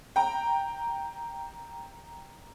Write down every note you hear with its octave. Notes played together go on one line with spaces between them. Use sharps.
G5 A#5